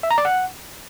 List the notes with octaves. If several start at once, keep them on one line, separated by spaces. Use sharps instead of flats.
E5
A#5
D5
F#5